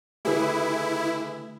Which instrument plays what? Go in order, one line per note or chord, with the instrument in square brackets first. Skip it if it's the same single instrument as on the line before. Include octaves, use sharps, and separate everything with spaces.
[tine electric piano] D3 A3 [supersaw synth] E4 [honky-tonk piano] G4 G#4 B4